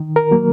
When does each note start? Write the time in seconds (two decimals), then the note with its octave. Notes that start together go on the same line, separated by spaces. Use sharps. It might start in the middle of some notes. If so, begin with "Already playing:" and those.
Already playing: D#3
0.16 A#4
0.31 F#3 A#3